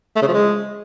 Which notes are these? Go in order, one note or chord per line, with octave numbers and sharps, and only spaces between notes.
A3
C#3
F3
G#3